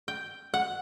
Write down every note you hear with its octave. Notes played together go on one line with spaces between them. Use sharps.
G5
F#5